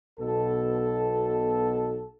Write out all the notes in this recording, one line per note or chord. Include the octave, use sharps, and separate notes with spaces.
B1 B2 A4